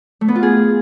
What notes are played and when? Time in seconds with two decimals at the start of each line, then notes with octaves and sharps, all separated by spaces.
0.21 A3
0.28 B3
0.36 F4
0.43 G#4